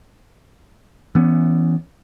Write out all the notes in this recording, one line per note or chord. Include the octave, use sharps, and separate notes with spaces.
E3 B3 C#4